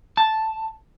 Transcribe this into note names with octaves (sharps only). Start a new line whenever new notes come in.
A5